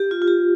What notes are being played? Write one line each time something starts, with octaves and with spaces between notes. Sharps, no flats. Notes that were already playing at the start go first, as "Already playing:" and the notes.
Already playing: G4
F4
F4
G4